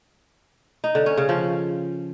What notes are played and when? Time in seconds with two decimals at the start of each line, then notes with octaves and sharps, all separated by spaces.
0.84 D#4
0.95 D3
1.06 C#4
1.18 C#3
1.29 F3